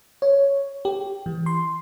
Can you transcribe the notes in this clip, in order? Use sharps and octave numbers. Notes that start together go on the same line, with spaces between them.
C#5
G4
E3
C6